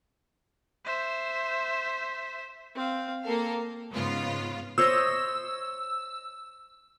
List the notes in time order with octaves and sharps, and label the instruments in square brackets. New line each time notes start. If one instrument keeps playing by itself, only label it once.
[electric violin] C5 E5
[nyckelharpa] C4 F5
[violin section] A#3 A4 F5 [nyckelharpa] A#4
[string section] G#2 C#3 B3 F4
[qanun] C5 C#5 D#5 [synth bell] E6